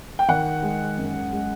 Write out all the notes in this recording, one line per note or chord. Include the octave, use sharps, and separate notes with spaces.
G5
D#3 F#5
G#3
F#2
G#3